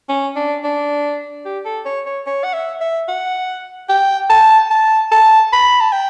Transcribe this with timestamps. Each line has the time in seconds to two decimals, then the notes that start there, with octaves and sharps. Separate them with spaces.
0.09 C#4
0.36 D4
0.64 D4
1.45 G4
1.65 A4
1.85 C#5
2.06 C#5
2.26 C#5
2.44 F#5
2.53 E5
2.81 E5
3.08 F#5
3.89 G5
4.30 A5
4.71 A5
5.12 A5
5.53 B5
5.81 A5
5.92 G5